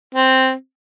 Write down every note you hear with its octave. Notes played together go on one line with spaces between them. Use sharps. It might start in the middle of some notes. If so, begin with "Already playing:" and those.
C4